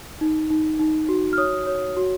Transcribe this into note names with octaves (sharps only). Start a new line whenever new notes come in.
D#4
D#4
D#4
F#4
F6
C#5 D#6
C#5
F#4